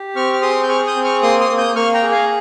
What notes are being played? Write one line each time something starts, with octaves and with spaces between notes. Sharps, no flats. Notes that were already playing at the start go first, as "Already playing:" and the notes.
Already playing: G4
C4 C#6 F6
F6
G#4 C6 D#6
G6
G#4 C#6 F6
D#6 G6
C4
C#6 F6
A#3 C6 D#6
C6 D#6
A#3
D#6 G6
A#3 C#6 F6
G5 A#5
G#4
F5 G#5